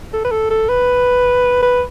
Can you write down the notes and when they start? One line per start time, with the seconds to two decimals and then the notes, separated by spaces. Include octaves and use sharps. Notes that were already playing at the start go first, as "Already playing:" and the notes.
0.13 A4
0.25 B4
0.31 A4
0.50 A4
0.69 B4
1.62 B4